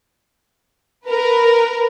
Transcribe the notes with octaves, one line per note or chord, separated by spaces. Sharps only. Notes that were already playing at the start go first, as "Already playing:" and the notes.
A#4 B4